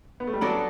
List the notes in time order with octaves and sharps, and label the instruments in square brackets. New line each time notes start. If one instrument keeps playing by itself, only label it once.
[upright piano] B3
A3
G3
[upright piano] F#3 [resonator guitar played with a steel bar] B3 D4 A4 D5